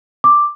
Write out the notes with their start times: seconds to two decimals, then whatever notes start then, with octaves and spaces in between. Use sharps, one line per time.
0.24 D6